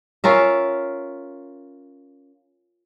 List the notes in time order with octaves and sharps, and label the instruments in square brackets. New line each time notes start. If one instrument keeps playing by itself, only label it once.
[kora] C#4 F4 A#4 E5